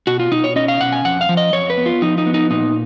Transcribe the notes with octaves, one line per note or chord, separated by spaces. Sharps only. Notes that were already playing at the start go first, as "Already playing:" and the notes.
B2 F#4
F4
B2 D#4
C#5
C#4 D#5
F5
B2 F#5
G#5
F2 F#5
F5
F3
D#5
F2 C#5
B4
B3
F4
F3 D#4
D#4
B3
D#4
A#2 D#4